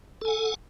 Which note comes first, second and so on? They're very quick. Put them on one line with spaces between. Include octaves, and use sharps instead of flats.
A4 G#5 F#5